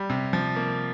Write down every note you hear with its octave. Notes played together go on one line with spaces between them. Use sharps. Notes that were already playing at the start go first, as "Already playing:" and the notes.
Already playing: G3
C3
F3
A#3